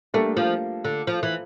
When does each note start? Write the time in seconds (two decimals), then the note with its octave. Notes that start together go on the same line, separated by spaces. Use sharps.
0.14 G3 A3 A#3 D4 A4
0.37 F3
0.85 D3
1.07 F3
1.23 E3